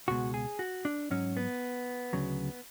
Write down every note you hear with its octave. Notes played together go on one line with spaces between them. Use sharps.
C#2 B2 G#3 F#4
G#4
F#4
D4
G#2 F#3 C#4
B3
D2 C#3 F#3